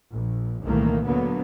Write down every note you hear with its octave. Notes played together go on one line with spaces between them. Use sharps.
A#1
C2 A#2 D#3 E3 A3 A#3
D2 D3 F#3 A#3 B3